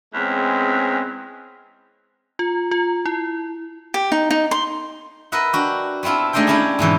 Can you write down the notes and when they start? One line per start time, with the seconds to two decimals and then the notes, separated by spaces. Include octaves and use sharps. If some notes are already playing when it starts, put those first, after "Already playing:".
0.14 E2 G#3 C4 C#4
2.39 F4
2.71 F4
3.06 E4
3.94 G4
4.12 D#4
4.31 D#4
4.51 C6
5.32 A#4 B4 D#5 E5 F#5
5.53 D4 F#4 G4
6.03 B3 C4 E4 F4 A4
6.33 G#3 A3 D4 D#4 C5 G5
6.47 C#4 D4 E4 F4 G4 G#4
6.79 G#2 B2 E3 F#3